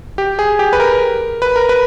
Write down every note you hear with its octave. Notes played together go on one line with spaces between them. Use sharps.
G4
G#4
G4
B4
A#4
B4
A#4
B4